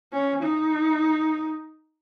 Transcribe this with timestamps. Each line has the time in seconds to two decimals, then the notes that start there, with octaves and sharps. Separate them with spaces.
0.13 C#4
0.42 D#4